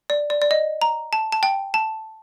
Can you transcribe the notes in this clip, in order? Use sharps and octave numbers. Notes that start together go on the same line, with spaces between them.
D5
D5
D5
D#5
A#5
A5
A5
G5
A5